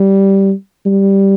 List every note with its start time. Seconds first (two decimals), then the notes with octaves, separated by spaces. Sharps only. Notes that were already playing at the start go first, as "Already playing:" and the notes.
Already playing: G3
0.86 G3